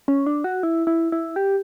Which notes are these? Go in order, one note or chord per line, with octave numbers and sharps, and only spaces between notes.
C#4
D4
F#4
E4
E4
E4
G4